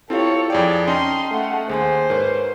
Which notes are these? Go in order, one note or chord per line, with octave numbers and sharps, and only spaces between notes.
C4 E4 F4 G4 A4 C#5 F5
F2 G#4 D5 G5
C#4 D#4 D#5 G5 A5 C6
A3 F#5
D#2 G#4 C5 G#5 C6
G#2 A#4 B4 C#5